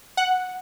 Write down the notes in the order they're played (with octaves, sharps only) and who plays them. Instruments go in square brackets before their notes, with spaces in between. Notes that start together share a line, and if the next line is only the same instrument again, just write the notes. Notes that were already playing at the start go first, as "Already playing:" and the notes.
[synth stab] F#5